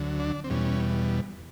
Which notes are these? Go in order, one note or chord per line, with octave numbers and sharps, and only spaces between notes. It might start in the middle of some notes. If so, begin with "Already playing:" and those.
Already playing: D2 D3 F#3
D4
C4
E2 B2 G3 C#4